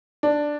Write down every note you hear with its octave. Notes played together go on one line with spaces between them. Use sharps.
D4